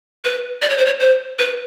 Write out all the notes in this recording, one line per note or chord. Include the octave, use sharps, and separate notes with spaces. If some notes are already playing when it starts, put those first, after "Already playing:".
B4
D5
C#5
C5
C#5
C5
B4